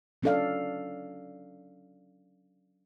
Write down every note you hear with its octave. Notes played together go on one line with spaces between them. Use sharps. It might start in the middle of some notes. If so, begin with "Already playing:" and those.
F#3 C#4 D4 A4 D5 F5